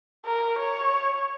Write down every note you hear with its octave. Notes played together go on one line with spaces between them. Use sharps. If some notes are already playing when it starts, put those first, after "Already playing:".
A#4
C#5